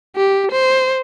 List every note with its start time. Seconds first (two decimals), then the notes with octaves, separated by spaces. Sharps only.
0.17 G4
0.52 C5